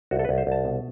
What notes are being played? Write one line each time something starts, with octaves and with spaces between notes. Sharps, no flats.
C2 F#4
A4
B4
C2
C5
C2 A5
B2